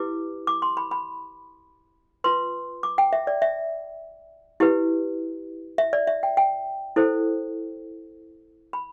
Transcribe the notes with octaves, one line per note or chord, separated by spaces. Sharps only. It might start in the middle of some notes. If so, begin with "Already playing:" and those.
Already playing: E4 G4 B4 D6
D6
C6
B5
B5
F4 B4 C6
D6
G5
E5
D5
E5
E4 G4 B4
E5
D5
E5
G5
G5
E4 A4 C5
B5